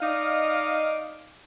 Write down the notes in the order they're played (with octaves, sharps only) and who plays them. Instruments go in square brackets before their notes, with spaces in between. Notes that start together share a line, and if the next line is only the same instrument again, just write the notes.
[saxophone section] D#4 D5 D#5 F5